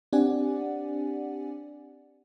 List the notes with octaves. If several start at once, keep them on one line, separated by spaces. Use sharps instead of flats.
C4 D4 G4 D5 F#5 G#5